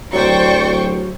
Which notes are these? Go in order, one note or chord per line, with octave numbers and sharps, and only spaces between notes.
D1 F#3 C5 D5 G5 C#6